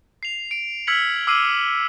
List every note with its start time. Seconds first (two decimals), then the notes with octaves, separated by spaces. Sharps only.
0.23 C7 F7
0.51 D7
0.87 E6 F6 G#6 B6 C#7 F#7
1.27 D6 E6 F6 C7 D#7